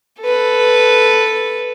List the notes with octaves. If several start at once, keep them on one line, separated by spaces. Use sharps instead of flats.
A4 B4